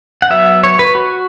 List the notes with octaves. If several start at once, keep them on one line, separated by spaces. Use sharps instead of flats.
F#5
F#3 B3 E5
C#5
B4
F#4